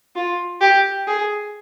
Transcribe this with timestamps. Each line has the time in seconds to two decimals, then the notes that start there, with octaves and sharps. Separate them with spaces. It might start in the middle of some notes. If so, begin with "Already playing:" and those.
0.16 F4
0.61 G4
1.07 G#4